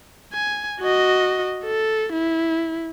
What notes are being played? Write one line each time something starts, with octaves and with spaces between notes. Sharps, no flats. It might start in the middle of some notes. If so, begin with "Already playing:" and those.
G#5
F#4 D#5
A4
E4